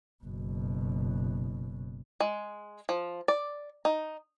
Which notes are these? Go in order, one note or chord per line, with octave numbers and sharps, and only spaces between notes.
F#1 B2
G#3
F3
D5
D#4